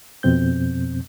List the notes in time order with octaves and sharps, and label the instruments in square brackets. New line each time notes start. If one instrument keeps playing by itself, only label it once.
[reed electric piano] F2 B2 C4 G6